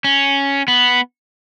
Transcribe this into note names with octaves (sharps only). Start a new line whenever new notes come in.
C#4
B3